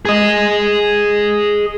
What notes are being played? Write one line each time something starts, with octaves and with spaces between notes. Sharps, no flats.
G#4 D#5